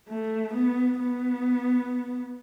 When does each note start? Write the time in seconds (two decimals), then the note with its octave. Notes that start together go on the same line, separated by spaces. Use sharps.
0.08 A3
0.54 B3
0.99 B3